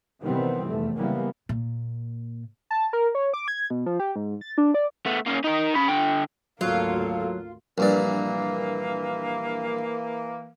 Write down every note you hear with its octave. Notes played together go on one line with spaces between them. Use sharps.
C3 D#3 E3 G3 B3 C4
F1 E2 A3
C#3 E3 G3 G#3 A#3 B3
A#2
A5
A#4
C#5
D6
G#6
B2
F3
G4
G#2
A6
D4
D5
A3 B3
A#3 C#4
D#4 A#4
C#4 B5
D3 G5
G#1 D2 F#3 A#3 F4 A4
A#1 G2 E3 A#3 D5